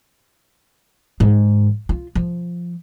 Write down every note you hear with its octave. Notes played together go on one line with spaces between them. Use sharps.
G#2 D#3
F4
F3